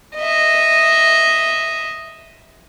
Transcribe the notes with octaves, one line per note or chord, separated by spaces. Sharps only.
D#5 E5